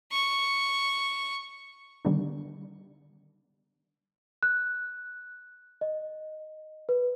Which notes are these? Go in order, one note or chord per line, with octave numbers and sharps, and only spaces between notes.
C#6
D3 D#3 G3 B3 D4 D#4
F#6
D#5
B4